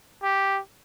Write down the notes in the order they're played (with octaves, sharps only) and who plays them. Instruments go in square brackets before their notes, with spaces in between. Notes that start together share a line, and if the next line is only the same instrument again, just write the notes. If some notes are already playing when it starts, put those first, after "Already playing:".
[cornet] G4